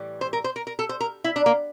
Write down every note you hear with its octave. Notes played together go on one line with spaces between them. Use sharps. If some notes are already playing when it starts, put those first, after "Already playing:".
Already playing: A2 E3 G3
C5
A#4
C5
A#4
A#4
A4
C5
A#4
E4
D4
A#3